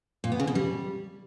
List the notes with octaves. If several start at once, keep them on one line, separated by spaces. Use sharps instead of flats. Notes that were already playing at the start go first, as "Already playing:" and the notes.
A#2
B3
C#3
B2
G3